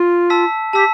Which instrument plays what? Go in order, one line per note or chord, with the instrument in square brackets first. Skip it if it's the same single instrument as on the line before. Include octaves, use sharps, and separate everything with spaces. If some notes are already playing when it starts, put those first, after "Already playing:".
Already playing: [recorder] F4
[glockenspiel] A5 E6 B6
[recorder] G4 [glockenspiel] A5 E6 B6